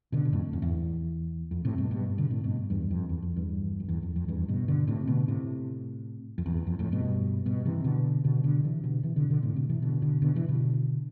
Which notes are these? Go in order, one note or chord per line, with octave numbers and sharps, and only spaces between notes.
B2 D3
B2
F2 A2
F2
E2
F2
A2 C3
G2 B2
G2 B2
B2 D3
A2 C3
G2 B2
E2 G2
F2
E2
F2
E2 G2
F2
E2
F2
F2
E2 G2
G2 B2
B2 D3
A2 C3
B2 D3
A2 C3
F2
E2
F2
F2 A2
G2 B2
G2 B2
C3 E3
B2 D3
B2 D3
B2 D3
C3 E3
B2 D3
C3 E3
B2 D3
B2 D3
A2 C3
B2 D3
C3 E3
B2 D3
B2 D3
B2 D3
C3 E3
B2 D3